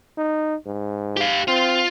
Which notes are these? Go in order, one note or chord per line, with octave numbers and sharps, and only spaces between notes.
D#4
G#2
G4 F5
C4 F4